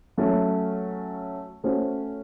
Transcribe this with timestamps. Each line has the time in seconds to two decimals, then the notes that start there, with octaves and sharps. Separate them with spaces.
0.17 F#3 A3 C#4
1.64 A3 C#4 F#4 C5